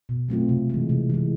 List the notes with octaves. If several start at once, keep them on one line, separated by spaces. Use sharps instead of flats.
B2
F#3 A3 C4 F4
C3
E3 G#3
C3
E3 G#3